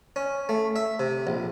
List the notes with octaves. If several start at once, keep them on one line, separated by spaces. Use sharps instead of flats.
C#4
A3
E5
C3
A#1